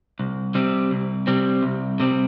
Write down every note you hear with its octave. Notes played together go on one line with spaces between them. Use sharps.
C2
C3 G3 C4
C2
C3 G3 C4
C2
C3 G3 C4